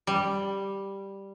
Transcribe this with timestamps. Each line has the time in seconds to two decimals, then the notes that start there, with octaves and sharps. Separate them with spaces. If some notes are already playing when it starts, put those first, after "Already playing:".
0.07 G3